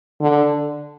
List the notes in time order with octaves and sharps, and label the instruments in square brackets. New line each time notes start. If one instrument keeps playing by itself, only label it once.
[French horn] D3